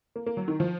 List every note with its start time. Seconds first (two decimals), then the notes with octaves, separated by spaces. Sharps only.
0.16 A#3
0.26 A#3
0.37 F#3
0.48 D#3
0.60 F3